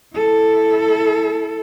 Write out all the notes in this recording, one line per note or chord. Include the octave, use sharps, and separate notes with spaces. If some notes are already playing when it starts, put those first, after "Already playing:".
E4 A4